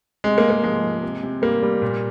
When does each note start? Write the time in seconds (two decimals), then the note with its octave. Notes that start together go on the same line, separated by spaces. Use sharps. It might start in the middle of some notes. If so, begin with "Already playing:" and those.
0.24 C3 G#3
0.38 A#3
0.44 C3
0.50 A#3
0.63 F3 G#3
0.83 F3
1.02 C3
1.23 C3
1.42 G3 A#3
1.63 G3
1.82 A#2